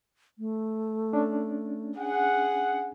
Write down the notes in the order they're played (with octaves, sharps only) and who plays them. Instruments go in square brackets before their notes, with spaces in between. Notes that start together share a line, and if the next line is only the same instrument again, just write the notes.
[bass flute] A3
[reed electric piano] C#4 D4
[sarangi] G#4 [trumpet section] F#5